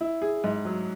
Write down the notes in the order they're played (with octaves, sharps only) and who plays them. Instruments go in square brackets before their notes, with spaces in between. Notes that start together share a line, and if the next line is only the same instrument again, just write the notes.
[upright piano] E4
G#4
G#2
F#3